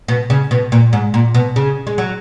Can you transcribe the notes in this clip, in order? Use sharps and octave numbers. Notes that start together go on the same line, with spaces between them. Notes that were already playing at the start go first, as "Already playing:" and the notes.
B2
C#3
B2
A#2
G#2
A#2
B2
C#3
G#3
F#3